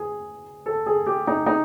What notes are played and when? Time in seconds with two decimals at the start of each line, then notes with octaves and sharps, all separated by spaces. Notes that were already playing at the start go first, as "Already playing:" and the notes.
Already playing: G#4
0.66 A4
0.86 G#4
1.07 G4
1.27 D#4
1.46 D#4